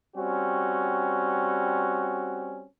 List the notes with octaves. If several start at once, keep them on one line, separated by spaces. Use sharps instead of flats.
G3 C4 C#4 F#4